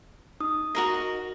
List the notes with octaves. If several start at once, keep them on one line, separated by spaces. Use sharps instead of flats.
D#4 D#6
F#4 A#4 D#5